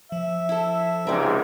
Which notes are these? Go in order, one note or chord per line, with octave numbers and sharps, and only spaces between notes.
F3 E5
E4 A4
C#2 G#2 C3 A#4 D5